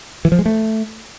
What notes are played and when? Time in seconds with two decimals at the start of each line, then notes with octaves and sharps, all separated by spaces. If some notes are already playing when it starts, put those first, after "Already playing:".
0.25 E3
0.32 F3
0.39 G#3
0.46 A3